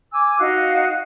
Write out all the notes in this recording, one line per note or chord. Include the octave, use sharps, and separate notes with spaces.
G#5 D6 E6
D#4 F#4 F5 F#6